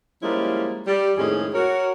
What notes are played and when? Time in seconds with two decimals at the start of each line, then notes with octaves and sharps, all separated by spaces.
0.23 F3 G3 G#3 A#3 C#4 E4
0.87 G3
1.17 F2 A2 D#3 G#3 C#4 G#4
1.54 F#4 A#4 C#5